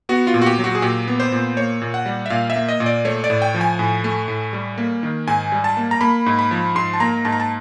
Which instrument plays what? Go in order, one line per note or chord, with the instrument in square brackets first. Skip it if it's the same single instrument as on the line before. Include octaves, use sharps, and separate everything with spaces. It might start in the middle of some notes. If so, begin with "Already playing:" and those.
[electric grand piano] B3 F#4
F4
A#2
F#4
G4
F#3
F#4
G#4
A#2 G4
B3
C5
A#2
A#3 C#5
A#2
F#5
G3
E5
A#2 F5
E5
A#3
D#5
A#2
D5
A3 C#5
D5
A2
G5
F3
G#5
A2
A3
A2
G3
A#3
D#3
G#2 G#5
G3
A5
A#3
A#5
A#3 B5
G#2
B5
F3
G#2 C6
A5
A#3 A#5
G#2 A5
A#5
A5